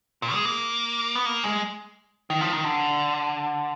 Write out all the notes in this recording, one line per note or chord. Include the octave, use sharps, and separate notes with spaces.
A#2
G#3
A#3
B3
A#3
G#3
D#3
F3
D#3
D3